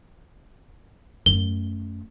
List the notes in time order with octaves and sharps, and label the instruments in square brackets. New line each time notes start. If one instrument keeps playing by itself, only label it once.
[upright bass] F#2 A3 [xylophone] G7